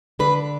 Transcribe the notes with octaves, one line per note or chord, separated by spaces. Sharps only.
D3 B4